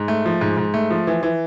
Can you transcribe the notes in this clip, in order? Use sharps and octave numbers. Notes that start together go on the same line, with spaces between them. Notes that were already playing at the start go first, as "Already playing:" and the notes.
Already playing: G#2
A3
F3
G#2
G#2
A3
F3
E3
E3